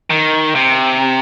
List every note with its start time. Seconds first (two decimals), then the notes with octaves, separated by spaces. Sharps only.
0.10 D#3
0.55 C3